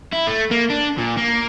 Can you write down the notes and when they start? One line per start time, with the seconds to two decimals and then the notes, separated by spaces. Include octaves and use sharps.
0.13 E4
0.27 A3
0.51 A#3
0.70 D4
0.98 A#2
1.17 A#3